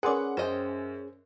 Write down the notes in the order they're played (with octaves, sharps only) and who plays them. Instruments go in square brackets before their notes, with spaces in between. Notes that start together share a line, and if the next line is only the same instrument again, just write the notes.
[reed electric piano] C#4 G#4 [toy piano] A#4 C6 D6 [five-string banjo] B4 D5 [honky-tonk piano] F#5
[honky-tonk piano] F#2 [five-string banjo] C5 D#5 G5